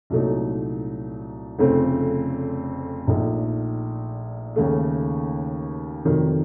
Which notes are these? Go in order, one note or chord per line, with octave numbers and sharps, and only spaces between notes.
C2 A#2 F#3 A3 D#4
F1 F2 C#3 A3 C4
A#1 A#2 A3 D#4
D#2 C#3 A3
F1 F2 C3 D#3 F#3